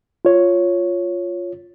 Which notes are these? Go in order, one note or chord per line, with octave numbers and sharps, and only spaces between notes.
F4 C#5